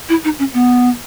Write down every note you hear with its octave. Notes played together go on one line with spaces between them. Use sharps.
E4
D#4
C#4
B3